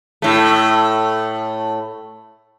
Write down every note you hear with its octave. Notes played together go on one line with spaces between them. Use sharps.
A2 A3